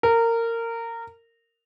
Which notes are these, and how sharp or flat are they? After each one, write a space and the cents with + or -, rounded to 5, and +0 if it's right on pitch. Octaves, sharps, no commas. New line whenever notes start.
A#4 -20